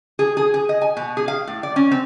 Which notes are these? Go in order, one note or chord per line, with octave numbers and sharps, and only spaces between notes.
G#4
G#4
G#4
D#5
G#5
B2
G#4
F5
A2
D5
C#4
C4